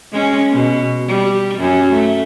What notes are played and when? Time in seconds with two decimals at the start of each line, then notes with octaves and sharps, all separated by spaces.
0.12 G#3 C#4
0.51 B2
1.07 G3
1.59 F#2 C#4
1.92 A3